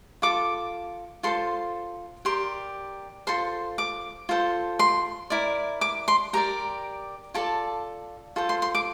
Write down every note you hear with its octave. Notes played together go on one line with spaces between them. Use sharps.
F4 A4 D6
F4 A4 C5 C6
G4 A#4 D5 C6
F4 A4 C5 C6
D6
F4 A4 C5
C6
E4 A#4 D5
D6
C6
G4 A#4 D5 A#5
F4 A4 D5 A5
F4 A4 C5
C6
C6
D6